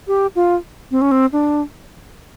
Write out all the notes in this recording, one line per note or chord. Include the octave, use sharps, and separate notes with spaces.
G4
F4
C4
C#4
C4
D4